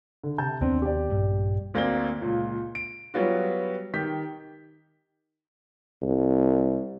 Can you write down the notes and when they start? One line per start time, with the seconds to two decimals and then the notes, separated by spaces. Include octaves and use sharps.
0.24 D3
0.38 C3 A5 G6
0.61 D#2 B3 C4 D4
0.82 G4 D5
1.10 A#1 G2
1.74 D2 A#3 C4 D5 G7
2.21 C#2 A#2
2.75 D7
3.14 F#3 G3 B3 F4 F#4
3.94 D#3 G4 G6 B6
6.03 C2